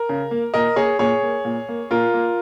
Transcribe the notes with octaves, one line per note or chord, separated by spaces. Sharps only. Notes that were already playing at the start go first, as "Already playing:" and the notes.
Already playing: A#4
C#3
A#3
A#2 A#4 D#5
A#3 G#4 C#5
A#2 G#4 C#5
A#3
A#2
A#3
A#2 F4 A#4
A#3